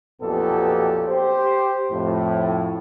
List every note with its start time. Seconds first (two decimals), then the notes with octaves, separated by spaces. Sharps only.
0.22 B1 F2 A#2 B3 G4 A4
1.08 G4 C5
1.91 F2 A2